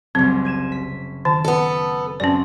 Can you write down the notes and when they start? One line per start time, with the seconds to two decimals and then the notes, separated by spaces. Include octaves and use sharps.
0.15 F#1 C2 C4
0.45 G#6 D#7 E7
0.72 B6
1.25 D#3 A5
1.45 B3 A4
2.20 F#2 C4 C#4 D5